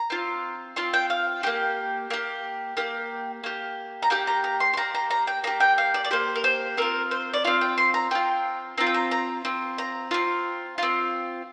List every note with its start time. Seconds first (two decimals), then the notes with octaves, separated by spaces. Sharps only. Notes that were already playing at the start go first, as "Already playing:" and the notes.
Already playing: A#5
0.10 C4 F4
0.76 C4 F4 C6
0.93 G5
1.10 F5
1.43 A#3 G4 G5
2.10 A#3 G4
2.77 A#3 G4
3.44 A#3 G4
4.02 A#5
4.10 A#3 G4 G5
4.27 A#5
4.44 A#5
4.60 C6
4.73 C6
4.77 A#3 G4 A#5
4.95 A#5
5.11 A#5
5.27 G5
5.44 A#3 G4 A#5
5.60 G5
5.78 F5
5.94 D5
6.05 D5
6.11 A#3 G4 C5
6.36 A#4
6.44 C5
6.77 C4 F4 A#4
7.11 C5
7.34 D5
7.45 C4 F4 F5
7.61 G5
7.78 C6
7.94 A#5
8.11 C4 F4 G5
8.78 C4 F4 A#5
8.87 G5
8.94 A#5
9.11 A#5
9.45 C4 F4
9.78 A#5
10.11 C4 F4
10.78 C4 F4